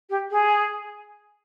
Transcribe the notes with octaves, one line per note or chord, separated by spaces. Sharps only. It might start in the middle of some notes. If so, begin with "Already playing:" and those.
G4
G#4